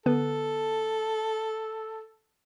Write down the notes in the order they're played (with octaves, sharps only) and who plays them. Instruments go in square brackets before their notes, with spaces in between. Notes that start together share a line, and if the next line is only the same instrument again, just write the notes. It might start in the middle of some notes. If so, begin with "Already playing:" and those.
[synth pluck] D3 B3 B4 [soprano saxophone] A4